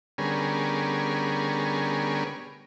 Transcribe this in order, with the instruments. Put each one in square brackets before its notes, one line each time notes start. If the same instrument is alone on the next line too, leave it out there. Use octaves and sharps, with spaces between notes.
[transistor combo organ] D3 G3 B3 C#4 G#4 A#4